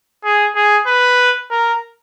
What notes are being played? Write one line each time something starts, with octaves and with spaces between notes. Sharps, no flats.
G#4
G#4
B4
A#4